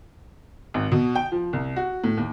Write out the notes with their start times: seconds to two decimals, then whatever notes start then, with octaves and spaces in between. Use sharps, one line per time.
0.74 G#1
0.92 B2
1.16 G5
1.32 F3
1.53 C2
1.76 F#4
2.04 A2
2.17 D#2